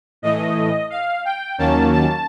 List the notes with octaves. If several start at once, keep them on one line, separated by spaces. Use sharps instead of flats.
A2 E3 A3 D#5
F5
G5
D#2 D#3 F#3 A#3 C#4 A5
A5